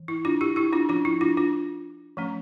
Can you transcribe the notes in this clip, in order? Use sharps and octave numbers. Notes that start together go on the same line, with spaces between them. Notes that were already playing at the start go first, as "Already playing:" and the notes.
Already playing: E3
E4
D4 F4
E4 G4
E4 G4
D4 F4
F3 C#4 D4 F4
E4
D4 F4
D4 F4
F3 A3 C#4